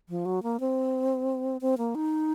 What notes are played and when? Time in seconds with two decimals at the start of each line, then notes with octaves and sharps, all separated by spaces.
0.09 F3
0.25 F#3
0.43 A#3
0.60 C4
1.61 C4
1.78 A#3
1.95 D#4